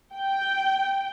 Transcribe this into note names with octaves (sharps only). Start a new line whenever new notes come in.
G5